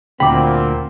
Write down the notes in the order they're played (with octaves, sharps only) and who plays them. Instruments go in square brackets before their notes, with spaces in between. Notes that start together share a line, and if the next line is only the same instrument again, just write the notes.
[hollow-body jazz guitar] D2 B5 [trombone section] A#2 C4 [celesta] G5 D6